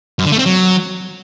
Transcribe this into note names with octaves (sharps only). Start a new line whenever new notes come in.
F#2
D3
A3
C4
F#3